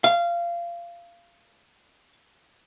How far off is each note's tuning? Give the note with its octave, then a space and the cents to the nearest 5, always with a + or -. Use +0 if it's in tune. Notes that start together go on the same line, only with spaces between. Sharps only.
F5 -20